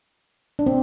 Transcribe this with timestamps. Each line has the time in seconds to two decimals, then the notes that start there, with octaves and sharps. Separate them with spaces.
0.59 D4
0.66 C4